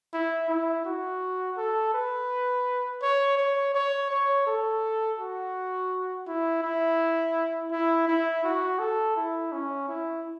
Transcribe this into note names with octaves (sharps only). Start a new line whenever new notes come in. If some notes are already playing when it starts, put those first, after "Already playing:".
E4
E4
F#4
A4
B4
C#5
C#5
C#5
C#5
A4
F#4
E4
E4
E4
E4
F#4
A4
E4
C#4
E4